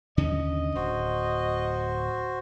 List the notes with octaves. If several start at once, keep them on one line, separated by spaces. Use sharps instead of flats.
D#2 D3 C#4 D#5
D1 F#4 C5